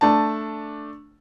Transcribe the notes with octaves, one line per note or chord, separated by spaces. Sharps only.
A3 D4 A5